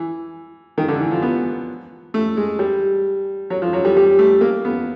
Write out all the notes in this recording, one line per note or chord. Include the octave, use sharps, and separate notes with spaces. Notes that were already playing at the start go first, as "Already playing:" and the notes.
Already playing: E3
D#3
D3
E3
F3
B3
A3
G#3
G3
F#3
F3
F#3
G3
G3
A3
A#3
B3